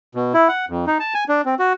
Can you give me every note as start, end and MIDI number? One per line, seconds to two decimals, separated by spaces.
0.15 0.33 47
0.34 0.48 64
0.48 0.65 78
0.69 0.85 41
0.87 0.98 63
1.00 1.14 81
1.14 1.24 80
1.29 1.42 62
1.45 1.55 60
1.59 1.73 66